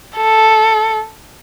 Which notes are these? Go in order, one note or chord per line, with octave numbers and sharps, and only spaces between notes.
A4